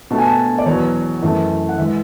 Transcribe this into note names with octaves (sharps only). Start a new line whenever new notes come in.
B2 A3 A5
G#5
A5
D5
E2 B2 F#3 C#5
F#2 E3 A3
F#5
E3 G#3 E5